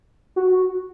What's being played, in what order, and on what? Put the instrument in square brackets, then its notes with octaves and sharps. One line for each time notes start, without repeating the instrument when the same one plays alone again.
[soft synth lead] F#4